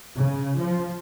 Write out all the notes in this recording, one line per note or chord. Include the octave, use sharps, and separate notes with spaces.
C#3
F3